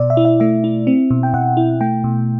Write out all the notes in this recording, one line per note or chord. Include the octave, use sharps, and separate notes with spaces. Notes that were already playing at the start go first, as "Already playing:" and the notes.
Already playing: B2 D5
E5
E4
E5
A3 E5
E4
C4
B2
G5
B2 F#5
E4
A3 G5
B2